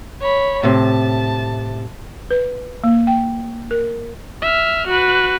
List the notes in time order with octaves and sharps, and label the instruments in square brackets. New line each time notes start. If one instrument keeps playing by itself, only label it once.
[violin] C#5 B5
[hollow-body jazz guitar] A2 C3 [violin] A5
[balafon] B4
A#3
G5
A#4
[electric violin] E5 F6
F#4 B4